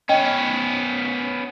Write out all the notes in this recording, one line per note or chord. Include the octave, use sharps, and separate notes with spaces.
B3 C#4 D#5 G5